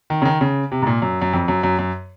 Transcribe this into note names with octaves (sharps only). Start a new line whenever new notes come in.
D#3
C#3
D#3
C#3
C3
G#2
A#2
F#2
F#2
F2
F#2
F#2
F#2